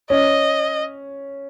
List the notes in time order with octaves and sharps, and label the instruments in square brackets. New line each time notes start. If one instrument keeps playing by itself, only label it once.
[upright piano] C#4 [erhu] D#5